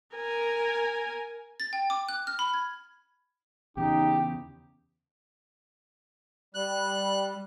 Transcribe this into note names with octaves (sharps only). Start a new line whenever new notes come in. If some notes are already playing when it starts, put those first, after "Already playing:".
A#4 G#5
A6
G5
D6
F#6
F6
B5
G#6
E2 C#3 D#4 G4
G3 F#6